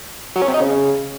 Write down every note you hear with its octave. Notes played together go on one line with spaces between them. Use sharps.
F#3
C#4
C3
D#4
C#3